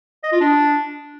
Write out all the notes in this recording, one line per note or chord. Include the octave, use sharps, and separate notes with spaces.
D#5
F4
D4